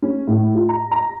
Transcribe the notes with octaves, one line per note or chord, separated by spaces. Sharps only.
C#4
A2
F4
A#5
A#5